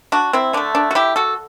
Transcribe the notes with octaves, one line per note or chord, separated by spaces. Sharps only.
D4 F#4
C4 E4
D3 A3 D4
D4
F#4
E4 G4
F#4 A4